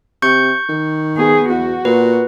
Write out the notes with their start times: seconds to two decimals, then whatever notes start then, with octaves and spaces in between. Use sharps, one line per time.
0.22 C3 C#6 G6 C#7
0.69 D#3
1.17 B3 G#4
1.49 E2 F#4
1.85 A#2 B4